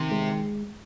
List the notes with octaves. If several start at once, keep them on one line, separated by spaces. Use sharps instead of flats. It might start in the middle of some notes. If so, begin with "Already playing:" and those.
Already playing: C3 D#3
G#3